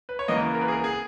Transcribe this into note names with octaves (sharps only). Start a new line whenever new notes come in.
B4
C#5
E2 C#3 E3 A#3 D#5
A#4
B4
G#4
A#4
G#4